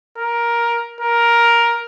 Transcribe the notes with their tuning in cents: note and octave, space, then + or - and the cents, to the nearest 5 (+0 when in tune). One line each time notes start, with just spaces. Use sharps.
A#4 +10
A#4 +10